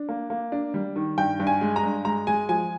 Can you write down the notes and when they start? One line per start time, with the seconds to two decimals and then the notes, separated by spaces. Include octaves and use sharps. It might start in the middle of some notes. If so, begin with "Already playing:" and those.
Already playing: D4
0.09 A#3
0.30 A#3
0.52 D4
0.74 G3
0.96 D#3
1.18 G2 G5
1.40 G2
1.47 G#5
1.61 G#3
1.76 A#5
1.83 G2
2.05 G#3 A#5
2.27 G#3 G#5
2.49 F3 G#5